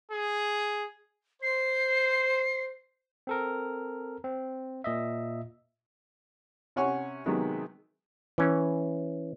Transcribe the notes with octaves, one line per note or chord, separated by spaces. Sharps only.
G#4
C5 C7
C4 A4 A#4
C4
A#2 D#5 E5
C3 C#4 C#5 F#5 G#5 C#6
C3 D#3 F#3 G#3 B3
E3 C#4